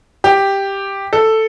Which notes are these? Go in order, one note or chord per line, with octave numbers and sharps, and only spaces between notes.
G4
A4